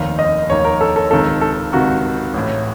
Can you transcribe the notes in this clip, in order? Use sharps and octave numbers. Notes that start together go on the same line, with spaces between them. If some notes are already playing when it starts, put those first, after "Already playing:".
Already playing: F1 D#2 D#3 F5
D#5
F1 D#2 D#3 C#5
A#4
A4
A4
C#2 C3 D#3 A4
A4
C#2 C3 D#3 F#4
A1 A2